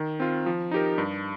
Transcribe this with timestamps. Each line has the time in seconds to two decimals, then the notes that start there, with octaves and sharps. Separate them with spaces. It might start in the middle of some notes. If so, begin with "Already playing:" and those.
Already playing: D#3
0.20 C4 F4
0.46 F3
0.71 D#4 G4 A#4
0.98 G2